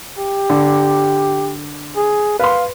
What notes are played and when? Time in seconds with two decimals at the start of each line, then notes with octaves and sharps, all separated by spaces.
0.18 G4
0.50 D3
1.97 G#4
2.39 B4 F5 C6